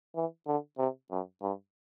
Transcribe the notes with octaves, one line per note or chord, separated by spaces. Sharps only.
E3
D3
C3
F#2
G2